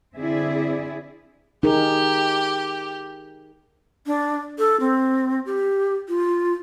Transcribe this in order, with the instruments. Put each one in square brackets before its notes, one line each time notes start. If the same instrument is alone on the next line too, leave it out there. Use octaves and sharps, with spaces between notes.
[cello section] D3 C4 E4 G#4 D5 E5
[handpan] D#4 G#4 A#4 [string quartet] G4
[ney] D4
A4
C4
G4
F4